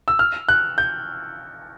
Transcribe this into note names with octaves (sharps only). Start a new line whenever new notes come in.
E6
F6
F#6
G6